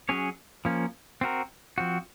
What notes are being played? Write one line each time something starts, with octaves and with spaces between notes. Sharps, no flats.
F#3 C#4 G#4 C#5
F3 A#3 C#4
C4 F#4 A#4
F3 C4 F#4